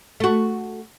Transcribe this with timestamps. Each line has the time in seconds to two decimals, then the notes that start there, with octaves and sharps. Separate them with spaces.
0.20 A3 F#4